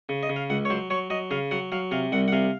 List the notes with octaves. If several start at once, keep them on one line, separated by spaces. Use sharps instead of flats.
C#3
D#5
C#3
F5
C#2 F#5
C#5
F#3 C5
F#3 C#5
F#3 D#5
C#3 F5
F#3 F#5
F#3 F5
C3 F5
C2 F#5
F#5
C3 F5